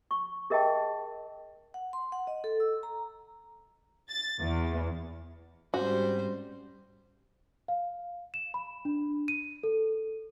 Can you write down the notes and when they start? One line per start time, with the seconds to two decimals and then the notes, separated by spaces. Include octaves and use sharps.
0.11 C#6
0.50 G#4 A#4 D#5 E5 G5 A5
1.74 F#5
1.93 C6
2.12 F#5
2.27 D#5
2.44 A4
2.60 E6
2.83 A#5
4.09 A6
4.42 E2
5.74 G#2 G3 C4 C#4 F#4 C5
7.68 F5
8.34 E7
8.54 B5
8.85 D4
9.28 D#7
9.64 A4